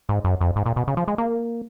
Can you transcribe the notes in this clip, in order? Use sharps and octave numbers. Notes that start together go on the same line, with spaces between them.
G#2
F#2
F2
G#2
A#2
B2
C#3
F3
G#3
A#3